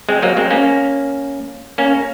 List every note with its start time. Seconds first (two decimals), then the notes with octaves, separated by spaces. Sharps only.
0.09 G#3 C4
0.22 F#3 A#3
0.37 G#3 C4
0.50 A#3 C#4
1.78 A#3 C#4